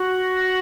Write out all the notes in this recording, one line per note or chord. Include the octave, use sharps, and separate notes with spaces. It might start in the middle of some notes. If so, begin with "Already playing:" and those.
Already playing: F#4